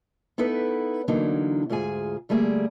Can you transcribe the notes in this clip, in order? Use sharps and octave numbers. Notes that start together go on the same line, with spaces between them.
B3 D#4 E4 A4 B4
D3 E3 F#3 A#3 D4 D#4
D2 G#2 F4 G#4 G#5
D3 G3 A3 A#3 G#4